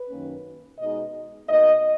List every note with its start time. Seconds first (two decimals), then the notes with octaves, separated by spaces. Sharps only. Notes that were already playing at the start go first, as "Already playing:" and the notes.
Already playing: B4
0.09 F#2 D#3 A#3 C#4
0.78 B2 G#3 D#4 D#5
1.48 B2 A#3 D#4 D#5